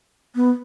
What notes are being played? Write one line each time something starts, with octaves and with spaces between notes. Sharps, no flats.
B3